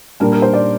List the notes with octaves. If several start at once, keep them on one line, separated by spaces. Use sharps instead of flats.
A#2 G3 D4 A#4
A#4
C5
D5